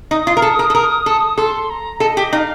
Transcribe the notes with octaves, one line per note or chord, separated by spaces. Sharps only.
D#4 D#6
F4
A#4
A4
A#4
A4
A#4
A4
A4 C6
A#5
A4 D#5
G4
D#4 F5